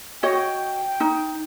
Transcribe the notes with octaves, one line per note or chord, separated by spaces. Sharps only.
F#4 C#5 D#5 G5
D#4